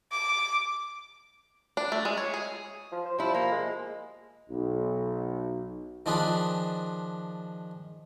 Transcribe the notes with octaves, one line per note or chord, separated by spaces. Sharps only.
D6
D4
A3
G#3
C#5
G#4
F3
C5
F3 G3 E4
A#3
G#3
B1
D#3 F3 D4 F4 G#4 B4